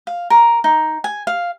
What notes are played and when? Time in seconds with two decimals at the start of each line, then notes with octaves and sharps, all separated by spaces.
0.07 F5
0.30 A#4
0.64 D#4
1.04 G#5
1.27 F5